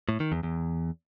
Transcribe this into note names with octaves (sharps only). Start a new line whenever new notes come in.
A2
D#3
E2
E2